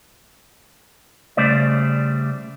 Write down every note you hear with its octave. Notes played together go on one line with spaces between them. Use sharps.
C#3 G3 A3 C5 D5